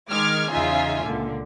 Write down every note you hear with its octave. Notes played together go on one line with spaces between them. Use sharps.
D#3 G#3 D6 F6 G#6
E2 C#3 D#4 F4 E5 G#5
C#2 A#2 D3